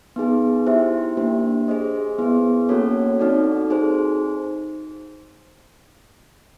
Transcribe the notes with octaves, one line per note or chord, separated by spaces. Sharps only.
B3 D#4 G#4
E4 G4 C5 E5
A#3 D4 G4 C5
G#4 C5 D#5
B3 E4 G#4
A#3 C#4 F#4 A4 C#5
C4 D#4 F#4 A4 D5
D#4 G#4 C5